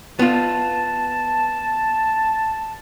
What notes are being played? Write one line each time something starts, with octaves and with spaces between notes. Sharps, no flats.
B3 F4 A5